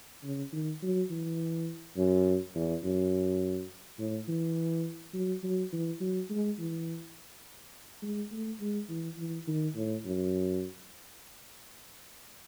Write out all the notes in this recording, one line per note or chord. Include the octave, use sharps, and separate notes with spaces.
C#3
D#3
F#3
E3
F#2
E2
F#2
A2
E3
F#3
F#3
E3
F#3
G#3
E3
G#3
A3
G#3
E3
E3
D#3
A2
F#2